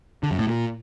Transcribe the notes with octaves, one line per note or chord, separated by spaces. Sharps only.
D3
F#2
A2
A#2